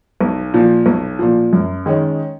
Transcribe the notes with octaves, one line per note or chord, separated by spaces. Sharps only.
B1
A#2 F3
B1
A#2 F3
F#2
D#3 G#3 C#4